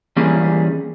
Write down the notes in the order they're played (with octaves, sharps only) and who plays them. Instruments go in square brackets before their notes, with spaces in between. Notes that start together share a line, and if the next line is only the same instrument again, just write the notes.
[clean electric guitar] E3 G3 A#3 C#4 G#4